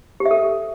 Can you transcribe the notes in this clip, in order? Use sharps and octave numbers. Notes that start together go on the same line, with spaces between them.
G4
E5
A4